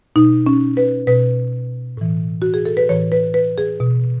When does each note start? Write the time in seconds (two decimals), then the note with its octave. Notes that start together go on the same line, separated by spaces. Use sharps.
0.16 B2 D#4
0.46 C#4
0.77 B4
1.07 B2 B4
1.97 A2 E3
2.42 F#4
2.54 G#4
2.65 A4
2.77 B4
2.89 A2 E3 C#5
3.12 B4
3.34 B4
3.58 G#4
3.80 B2